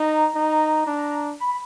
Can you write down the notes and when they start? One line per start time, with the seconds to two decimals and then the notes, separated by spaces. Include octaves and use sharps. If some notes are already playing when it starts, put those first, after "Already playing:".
Already playing: D#4 A#5
0.35 D#4
0.86 D4
1.40 B5